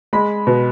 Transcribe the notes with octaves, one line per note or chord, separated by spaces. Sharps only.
G#3 B5
B2